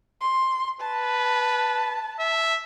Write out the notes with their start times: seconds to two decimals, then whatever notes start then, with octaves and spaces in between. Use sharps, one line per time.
0.21 C6
0.80 B4 A5
2.20 E5